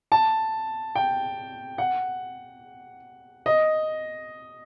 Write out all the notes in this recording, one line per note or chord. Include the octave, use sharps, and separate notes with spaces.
A5
G5
F#5
D#5